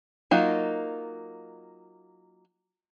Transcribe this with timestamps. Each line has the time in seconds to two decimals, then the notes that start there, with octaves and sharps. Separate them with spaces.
0.31 F#3 A#3 D#4 F4